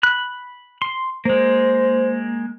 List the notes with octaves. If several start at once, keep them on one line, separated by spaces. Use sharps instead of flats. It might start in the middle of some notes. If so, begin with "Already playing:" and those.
B5 F#6
C6
G#3 A#3 C5